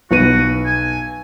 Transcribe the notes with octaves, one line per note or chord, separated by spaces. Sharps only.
B1 F#4 B4 D#7
G#5